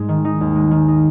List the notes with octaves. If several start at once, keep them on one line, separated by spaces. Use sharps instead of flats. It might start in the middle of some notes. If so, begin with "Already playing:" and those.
Already playing: G#2 G#3
D#3
D#4
D#2
G#3
D#3
D#4